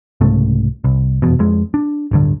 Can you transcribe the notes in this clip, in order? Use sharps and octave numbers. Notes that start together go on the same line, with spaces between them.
C2 G#2 C#3 A3
C2
F1 E2 B2
F2 G#3
D4
D1 G2 D3